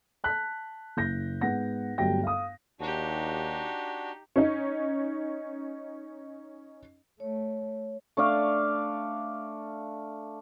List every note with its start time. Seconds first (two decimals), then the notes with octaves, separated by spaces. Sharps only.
0.24 A5 F#6 B6
0.97 F#1 G6 A#6
1.41 G#2 B3 F#5 A#6
1.98 G1 F#3 G3 A3 G5 A#6
2.23 F5 D#6
2.80 D#2 D4 D#4 F#4 G4
4.36 C#4 D#4
7.20 A3 C#5
8.17 A3 D4 D5 F5